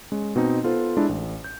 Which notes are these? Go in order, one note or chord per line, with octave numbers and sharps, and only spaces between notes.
G#3 C#4
B2 C4 D#4
B3 F4 A4 C5
G#3 D4 E4
A1
G6